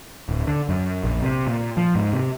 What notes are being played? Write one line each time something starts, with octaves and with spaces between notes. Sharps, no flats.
D1
D3
F#2
A#1
C3
A#2
F3
G#2
C3